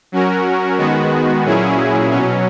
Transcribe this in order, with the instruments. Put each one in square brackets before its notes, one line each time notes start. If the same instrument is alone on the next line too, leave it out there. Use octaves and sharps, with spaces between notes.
[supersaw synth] F#3 C#4 F#4 A#4
D#3 G#3 B3 F#4
A#2 F#3 C#4 E4 G#4
B2 F#3 C#4